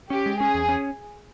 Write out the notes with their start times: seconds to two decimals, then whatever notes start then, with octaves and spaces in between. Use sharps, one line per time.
0.10 C#4 G4
0.26 G#3
0.40 C#4 G#4
0.54 E2
0.69 C#4